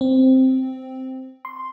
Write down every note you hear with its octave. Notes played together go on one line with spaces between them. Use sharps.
C4
C6